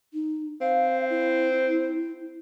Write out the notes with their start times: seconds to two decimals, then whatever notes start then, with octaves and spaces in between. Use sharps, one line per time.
0.13 D#4
0.61 C4 F5
1.10 E4